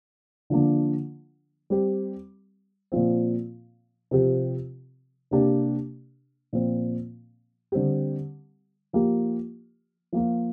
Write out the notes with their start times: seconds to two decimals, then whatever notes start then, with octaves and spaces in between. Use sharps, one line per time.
0.50 D3 F3 A#3 D4
1.70 G3 C4 G4
2.92 A#2 F3 C4
4.11 C3 F3 C4 G4
5.31 C3 A#3 D4 G4
6.53 A#2 F3 C4
7.72 D3 G3 C4 G4
8.93 F3 A#3 G4
10.12 F3 A#3 F4